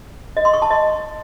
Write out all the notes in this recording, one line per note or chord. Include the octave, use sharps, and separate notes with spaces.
D#5
C6
C#6
A5
D#5